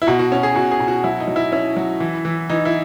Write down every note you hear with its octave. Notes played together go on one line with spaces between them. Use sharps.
E4
B2 F#4
F#4
C#4
G#4
B2 F#4
G#4
B2
F#4
F#3 E4
D#4
F#3
E4
C#4 E4
F#3
E3
E3
E3 D#4
E4